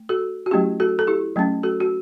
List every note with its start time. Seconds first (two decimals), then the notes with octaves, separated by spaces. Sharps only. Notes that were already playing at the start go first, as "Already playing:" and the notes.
Already playing: A3
0.09 F#4 A4
0.46 F#4
0.51 F#3 A3 C#4 E4 G4
0.80 F#4 A4
0.99 A4
1.07 E4 G4
1.36 F#3 A3 C#4
1.63 F#4 A4
1.80 F#4